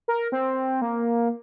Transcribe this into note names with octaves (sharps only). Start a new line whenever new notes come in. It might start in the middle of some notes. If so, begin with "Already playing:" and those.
A#4
C4
A#3